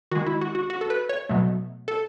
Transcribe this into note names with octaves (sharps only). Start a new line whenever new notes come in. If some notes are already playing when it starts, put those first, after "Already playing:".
D#3 G#3 F#4
E4
F#4
F#4
F#4
A4
B4
C#5
B2 F#3 A3
A4